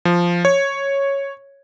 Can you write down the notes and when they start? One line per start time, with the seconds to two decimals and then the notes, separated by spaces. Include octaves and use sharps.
0.05 F3
0.45 C#5